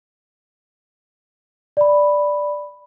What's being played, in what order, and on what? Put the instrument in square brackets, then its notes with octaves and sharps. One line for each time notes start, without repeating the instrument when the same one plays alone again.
[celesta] D5 B5